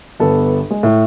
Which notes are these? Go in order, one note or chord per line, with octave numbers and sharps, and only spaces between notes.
G1 B3 A4
G#3
A2